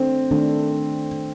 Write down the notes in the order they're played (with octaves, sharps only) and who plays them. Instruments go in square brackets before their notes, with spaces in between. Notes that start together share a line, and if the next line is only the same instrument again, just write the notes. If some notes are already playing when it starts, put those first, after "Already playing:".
Already playing: [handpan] D#3 A3 D4 A4 [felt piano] C4
[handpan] D#3 A3 D4 A4